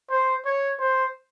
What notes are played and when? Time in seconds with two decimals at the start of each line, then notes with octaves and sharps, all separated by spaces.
0.10 C5
0.45 C#5
0.80 C5